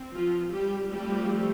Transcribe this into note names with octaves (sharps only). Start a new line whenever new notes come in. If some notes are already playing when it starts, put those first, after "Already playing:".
Already playing: C4
F3 F4
G3 G4
F3 G3 A3 C4 G4